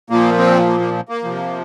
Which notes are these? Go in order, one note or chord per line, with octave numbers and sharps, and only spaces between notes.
A#2 F3 A#3
C4
A#3
A#3
A#3
C3 F3